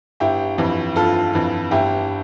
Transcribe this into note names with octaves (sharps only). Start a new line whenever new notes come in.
G1 E4 G4
F2 E3
G1 F4 A4
F2 E3
G1 E4 G4